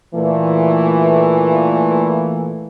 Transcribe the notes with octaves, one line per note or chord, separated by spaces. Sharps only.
A#2 E3 A3